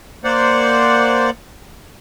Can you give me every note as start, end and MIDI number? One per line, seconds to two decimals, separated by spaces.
0.24 1.30 58
0.24 1.30 72
0.24 1.30 74
0.24 1.30 78